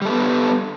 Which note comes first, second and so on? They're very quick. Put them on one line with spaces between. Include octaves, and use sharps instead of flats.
G3 A4 B3